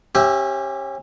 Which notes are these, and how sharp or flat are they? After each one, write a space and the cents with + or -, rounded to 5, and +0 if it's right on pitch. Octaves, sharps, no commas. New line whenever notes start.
C#4 -30 G4 +0 E5 +0